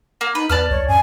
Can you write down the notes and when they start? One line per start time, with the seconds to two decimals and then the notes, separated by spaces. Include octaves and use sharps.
0.21 A#3
0.35 D#4 B4
0.49 E2 B4 D5 A5 F6
0.70 C2 C#5
0.88 F#2 G#5